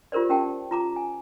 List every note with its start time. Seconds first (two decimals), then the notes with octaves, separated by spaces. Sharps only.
0.12 F4 G4 A#4 C5 D5
0.30 C#4 G4 A#4 F#5 G5 A5
0.71 F4 A#5 D6
0.96 G#5